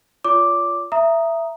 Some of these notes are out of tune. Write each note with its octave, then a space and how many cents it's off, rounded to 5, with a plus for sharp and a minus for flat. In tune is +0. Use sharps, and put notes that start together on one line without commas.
F4 +0 C#5 +45 D6 +0
E5 +15 A#5 +0 D#6 +0